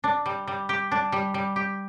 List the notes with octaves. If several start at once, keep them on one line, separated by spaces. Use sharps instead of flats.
D4
G3
G3
G4
D4
G3
G3
G4